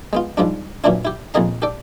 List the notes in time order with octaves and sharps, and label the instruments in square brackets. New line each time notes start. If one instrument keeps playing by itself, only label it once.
[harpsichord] G#3 B3 F4
G#2 F3 G3 D4
F#2 A#2 E3 C#4 D4 E4
E4 G4
A#1 F2 C#3 G#4 D#5 A#5
G4 A4 D5